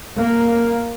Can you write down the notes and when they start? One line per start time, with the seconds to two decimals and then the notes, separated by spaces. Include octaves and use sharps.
0.19 A#3